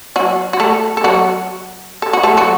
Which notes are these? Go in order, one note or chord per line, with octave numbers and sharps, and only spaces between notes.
F#3 F#4
F#4
A3 A4
A4
F#3 F#4
A4
F#4
A3 A4
F#3 F#4